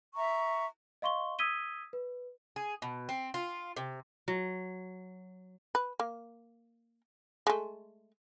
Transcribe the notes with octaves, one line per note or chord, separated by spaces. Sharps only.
E5 A#5 C#6
D#5 F5 C6 C#6 G7
D#6 E6 G#6 B6 D#7 G7
B4
G#4
B2
C4
F4
C3
F#3
B4
A#3
G#3 A3